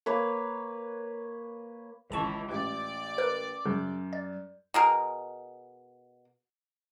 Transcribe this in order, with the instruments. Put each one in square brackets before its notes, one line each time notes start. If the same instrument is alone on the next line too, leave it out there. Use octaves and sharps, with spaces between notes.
[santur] A#3 B4 C#5
[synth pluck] G#1 A5 C#6 [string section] C#2 E3
[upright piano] A1 [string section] D5 D6
[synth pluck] A#4 B4
[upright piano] F#2 G6 [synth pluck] C#3
[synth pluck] D5
[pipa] B2 G#4 A#4